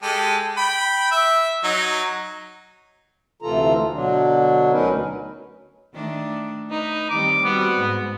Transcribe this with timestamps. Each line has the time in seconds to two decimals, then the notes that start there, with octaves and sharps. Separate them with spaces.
0.03 G#3 G4 A4
0.57 G5 B5
1.11 E5
1.64 F#3 D#4
3.42 D2 C3 E3 F4 A4 A#5
3.93 B2 D3 F#3 D4
4.72 D2 F#3 C#4 D#4 A#4 B4
5.94 D#3 A3 D4
6.71 D#4 B4
7.10 D#3 G3 C4 D6
7.45 G3 B3 C4 F#4
7.76 G#2